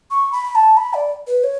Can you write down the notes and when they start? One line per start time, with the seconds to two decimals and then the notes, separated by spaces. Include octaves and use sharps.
0.11 C#6
0.32 B5
0.55 A5
0.77 B5
0.94 D5
1.27 B4
1.44 C#5